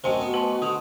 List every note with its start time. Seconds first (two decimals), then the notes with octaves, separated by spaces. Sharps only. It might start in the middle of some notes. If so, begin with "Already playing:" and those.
0.04 F#2 C3 A3 C5 D#5 G#5 C6
0.21 B3 F#4
0.34 B4 A5 C6
0.62 D3 D#6